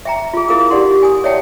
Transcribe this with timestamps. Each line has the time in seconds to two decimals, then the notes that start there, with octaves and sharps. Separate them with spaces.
0.05 E5 G5 A#5
0.34 F4 G#4
0.48 E4 G#4 A#4 F5 D#6
0.70 D#4 G4 D5 F#5 C6
1.03 G#5 D#6
1.24 C#5 D5 E5 F#5 G5 A5